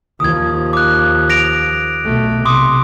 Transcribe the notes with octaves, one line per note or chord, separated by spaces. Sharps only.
D#2 F3 D#6 G#6
D6 F#6
A#6 D7 F7
B1 A3
C3 C6 D6 D#6